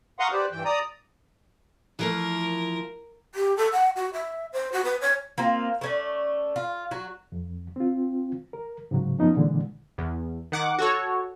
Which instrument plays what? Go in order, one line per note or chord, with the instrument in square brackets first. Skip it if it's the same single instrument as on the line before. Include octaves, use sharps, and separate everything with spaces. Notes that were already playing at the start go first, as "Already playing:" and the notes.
[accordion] F5 F#5 A#5 C6 C#6 D#6
G4 B4 C5 D5
G2 E3 G5
D5 A#5 D#6
[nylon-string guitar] E3 F3 A3 [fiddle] A#4
[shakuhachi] G4
A4
F#5
F#4
E5
C5
F#4
B4
C#5
[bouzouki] A#3 C4 F4
A3 C#4 D5
F4
F#3 F#4
[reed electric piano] F2
C4 F4
A#4
G#2 C#3 F#3
F#2 F3 B3 C#4 D#4
A#2 D3 E3 G#3
[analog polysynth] E2
D#3 F#5 D6
F#4 A4 C#5